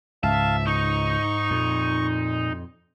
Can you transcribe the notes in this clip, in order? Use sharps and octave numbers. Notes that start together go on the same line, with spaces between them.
C#2 G#2 E5 F5 A5
D#4 C#6
F2 A#2